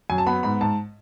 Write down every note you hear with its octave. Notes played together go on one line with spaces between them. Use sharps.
F#2 G#5
A5
B3 B5
G#2 B5
G#2 A5